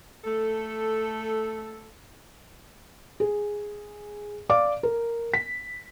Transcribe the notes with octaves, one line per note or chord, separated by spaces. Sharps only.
A3 A4
G#4
D5 F5 D6
A#4
B6